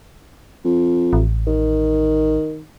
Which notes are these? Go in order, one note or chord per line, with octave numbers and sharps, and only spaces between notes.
F2
A1
D#3